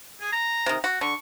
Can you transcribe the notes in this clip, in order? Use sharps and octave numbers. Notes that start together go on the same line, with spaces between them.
G#4
A#5
C3 D#3
F#4
D3 C#6